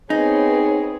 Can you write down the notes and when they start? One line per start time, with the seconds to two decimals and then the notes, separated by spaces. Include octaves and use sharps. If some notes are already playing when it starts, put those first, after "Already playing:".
0.10 B3 C4 D#4 G#4 C#5